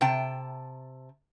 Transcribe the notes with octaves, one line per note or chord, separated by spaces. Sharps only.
C3 G5 A5